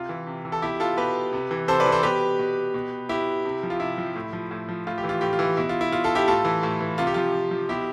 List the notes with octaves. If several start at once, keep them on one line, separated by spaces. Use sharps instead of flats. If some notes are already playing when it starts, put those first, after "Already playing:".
Already playing: C3 F4
E3
C3
E3
A4
B2 E4 G4
F4 A4
B2 G4 B4
C3
E3
C3 A4 C5
B4 D5
E3
A4 C5
B2 G4 B4
B2
B2
B2 E4 G4
C3
F3
F4
C3 E4
F3
A2
F3
A2
F3
A2 F4
G4
E3
F4
A2 G4
F4
E3
B2 E4
F4
E4
B2 F4
F4 A4
E4 G4
A2 F4 A4
E3
A2
E3
C3 F4
G4
F3 F4
C3
F3
B2 E4 G4